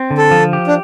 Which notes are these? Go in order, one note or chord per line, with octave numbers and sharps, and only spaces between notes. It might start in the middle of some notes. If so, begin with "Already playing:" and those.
Already playing: C4
D3
A4
F3
G4
D4